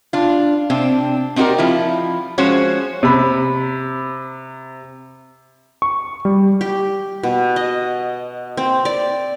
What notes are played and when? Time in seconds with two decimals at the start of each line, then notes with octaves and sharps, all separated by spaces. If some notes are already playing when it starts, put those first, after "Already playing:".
0.13 D4 F4
0.70 C3 C4 D4
1.36 C4 D#4 F#4 G4 A#4 D5
1.58 F3 E4 F4
2.38 F3 G#3 C#4 F#4 C5 C#5
3.03 C3 B5
5.82 C#6
6.25 G3
6.61 G4
7.23 B2
7.56 D#5
8.57 C4
8.85 D5